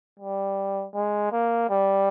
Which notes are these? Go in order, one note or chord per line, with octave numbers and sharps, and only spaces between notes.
G3
G#3
A#3
G3